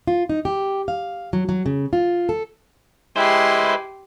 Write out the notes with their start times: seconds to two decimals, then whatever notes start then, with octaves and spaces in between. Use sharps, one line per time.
0.07 F4
0.29 D#4
0.45 G4
0.88 F5
1.33 F#3
1.49 F#3
1.66 C#3
1.93 F4
2.29 A4
3.16 G#3 E4 G4 B4 C5 G#5 C6